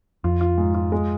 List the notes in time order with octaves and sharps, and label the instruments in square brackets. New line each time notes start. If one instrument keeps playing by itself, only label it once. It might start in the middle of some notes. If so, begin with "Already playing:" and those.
[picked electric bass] F2 [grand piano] F4
[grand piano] F4
G#2
F4
G#3